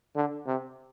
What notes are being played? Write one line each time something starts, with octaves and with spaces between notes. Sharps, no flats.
D3
C3